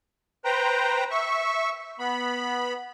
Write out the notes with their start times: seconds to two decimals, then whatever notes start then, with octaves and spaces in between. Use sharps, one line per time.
0.45 B4 C5 G5 A#5
1.11 E5 C#6
1.99 B3 B5